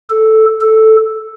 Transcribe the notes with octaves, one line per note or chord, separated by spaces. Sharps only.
A4
A4